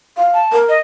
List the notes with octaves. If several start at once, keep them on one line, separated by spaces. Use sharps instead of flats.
F5
A5
A#4
D#5